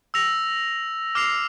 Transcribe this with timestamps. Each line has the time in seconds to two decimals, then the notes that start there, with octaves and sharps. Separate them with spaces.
0.14 E6 A#6 F7
1.15 D6 F6 C7 F7